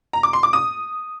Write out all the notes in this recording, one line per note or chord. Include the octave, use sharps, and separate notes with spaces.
A#5
D6
C6
D6
D#6